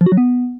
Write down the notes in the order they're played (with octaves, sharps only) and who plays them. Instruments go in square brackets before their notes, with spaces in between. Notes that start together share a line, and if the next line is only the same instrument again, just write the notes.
[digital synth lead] F3
F#4
F#3
B3